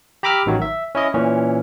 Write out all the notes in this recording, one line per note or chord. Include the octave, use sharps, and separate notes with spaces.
G4 A#5 B5 D6 E6 F6
A1 D#3 F#3
E5
C#4 E4 D#5
A#2 E3 C#4